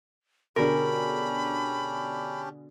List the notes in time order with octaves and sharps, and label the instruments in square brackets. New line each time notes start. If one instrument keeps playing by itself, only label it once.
[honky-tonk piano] B2 D3 G#4 [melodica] C#4 D4 G4 [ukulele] A#4 [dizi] B5